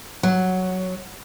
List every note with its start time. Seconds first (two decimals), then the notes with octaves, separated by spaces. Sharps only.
0.23 F#3